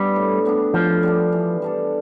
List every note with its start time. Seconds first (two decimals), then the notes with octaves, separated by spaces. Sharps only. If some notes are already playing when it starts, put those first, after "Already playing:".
Already playing: G3 B3 D4
0.16 A2
0.45 G3 B3 D4
0.74 A2 F3
1.03 G3 B3 D4
1.32 E3
1.62 G3 D4 A4